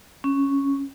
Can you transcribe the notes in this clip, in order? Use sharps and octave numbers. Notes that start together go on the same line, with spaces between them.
C#4